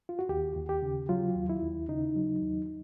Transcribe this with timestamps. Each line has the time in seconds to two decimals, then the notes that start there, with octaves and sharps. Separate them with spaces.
0.09 F4
0.19 F#4
0.29 D#2 G4
0.56 D#2
0.69 G4
0.82 C#3
1.09 F#3 F4
1.36 D#2
1.50 E4
1.62 D#2
1.89 C#3 D#4
2.16 F#3
2.42 D#2